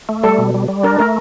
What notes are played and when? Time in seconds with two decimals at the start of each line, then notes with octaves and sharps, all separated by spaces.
0.09 A3
0.23 G3 A4
0.38 B2
0.54 G3
0.68 G3
0.83 D4 A#4
0.99 A3 A#4